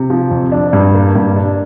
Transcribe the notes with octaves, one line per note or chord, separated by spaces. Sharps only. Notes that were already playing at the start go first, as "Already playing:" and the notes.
Already playing: C3
F3
F2
D4
G2
A#3
G2
D4